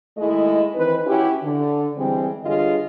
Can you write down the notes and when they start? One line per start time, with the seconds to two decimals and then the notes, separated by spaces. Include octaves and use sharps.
0.18 D#2 G#3 A3 E4 D#5
0.75 D#3 E3 C4 D#4 B4
1.07 C#4 E4 F#4 G4
1.43 D3
1.97 E3 G3 G#3 C4
2.44 G2 D3 F4 G#4 C#5 D#5